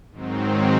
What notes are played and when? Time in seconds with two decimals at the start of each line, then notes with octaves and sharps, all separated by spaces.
0.11 G#2 D#3 F#3 C4